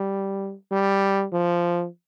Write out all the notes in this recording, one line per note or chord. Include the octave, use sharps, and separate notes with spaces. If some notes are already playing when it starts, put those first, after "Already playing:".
Already playing: G3
G3
F3